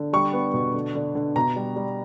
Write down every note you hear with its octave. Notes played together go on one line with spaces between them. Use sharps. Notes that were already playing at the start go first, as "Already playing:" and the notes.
Already playing: D3
G3 C#6
B3
B2
D3
D3
D3
B2 A#5
G3
G3